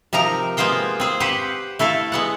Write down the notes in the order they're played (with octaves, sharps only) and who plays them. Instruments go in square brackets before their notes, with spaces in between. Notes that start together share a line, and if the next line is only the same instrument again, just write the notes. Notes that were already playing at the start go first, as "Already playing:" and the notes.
[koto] C3 F3 D#4 A#4 A#5
G#3 A#3 B3 F4 C5 G5
C4 G#4 C5
G4 B4 C5 F#5
A3 E4 A4 F5
G#3 B3 F#5